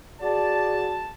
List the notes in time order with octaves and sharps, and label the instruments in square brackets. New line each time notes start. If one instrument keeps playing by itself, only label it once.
[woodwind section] F#4 G#4 [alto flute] D5 [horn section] A5